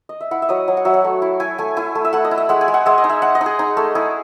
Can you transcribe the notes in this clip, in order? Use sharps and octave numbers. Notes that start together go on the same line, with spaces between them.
D#5
E5
E4 F#5
E5
F#3 D#5
F#3 G#5
F#5
F#3 E5
F#5
A3
E4
E4 G#5
A3 G#5
E4 G#5
A3
E5
A3 F#5
D#5
E4
E5
G#3 F#5
G#5
G#3
F#5
G#3 E5
D#5
D#4
E5
D#4 F#5
D#5
D#4
G#4
D#4
A3
E4 G#4